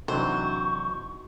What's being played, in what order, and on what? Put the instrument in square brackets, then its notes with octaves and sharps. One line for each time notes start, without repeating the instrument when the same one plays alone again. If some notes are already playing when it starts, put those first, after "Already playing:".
[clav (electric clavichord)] C3 E3 F#3 [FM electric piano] D4 D#4 F#4 [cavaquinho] C5 [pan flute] C#6